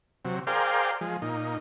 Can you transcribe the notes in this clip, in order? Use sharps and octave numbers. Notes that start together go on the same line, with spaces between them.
C3 F#3
G#4 A#4 C5 D5 F5 G5
F3 G#3
A#2 D#4